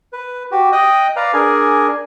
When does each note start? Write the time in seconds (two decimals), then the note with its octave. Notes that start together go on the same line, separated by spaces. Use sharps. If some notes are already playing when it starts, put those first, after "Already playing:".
0.13 B4
0.52 F#4 G4
0.72 D#5 G5 D#6 F#6
1.16 B4 D5 F5 A#5
1.34 D4 G#4 A#4 G#5